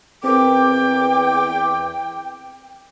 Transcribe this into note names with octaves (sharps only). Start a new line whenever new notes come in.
E2 C4 A#4 G5 D6